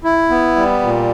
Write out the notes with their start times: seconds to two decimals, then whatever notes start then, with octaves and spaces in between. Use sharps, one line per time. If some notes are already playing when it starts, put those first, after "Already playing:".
0.04 E4
0.30 B3
0.56 G3
0.82 A#2